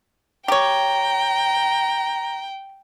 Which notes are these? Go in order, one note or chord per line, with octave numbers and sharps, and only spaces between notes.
G4 C#5 G5 A#5